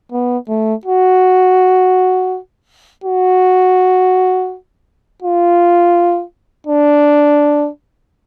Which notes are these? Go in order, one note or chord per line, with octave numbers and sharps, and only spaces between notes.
B3
A3
F#4
F#4
F4
D4